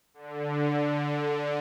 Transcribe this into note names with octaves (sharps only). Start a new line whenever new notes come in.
D3